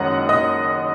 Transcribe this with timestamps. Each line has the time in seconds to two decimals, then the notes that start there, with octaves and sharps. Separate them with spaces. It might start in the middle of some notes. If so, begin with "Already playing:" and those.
Already playing: F#1 F#2 D#3 G#3 A#4 C#5 D#5 F#5
0.29 D#5